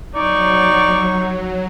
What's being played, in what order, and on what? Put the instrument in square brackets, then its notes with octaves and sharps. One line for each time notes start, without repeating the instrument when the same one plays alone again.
[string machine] F#3 [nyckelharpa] D#4 C#6 [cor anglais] D5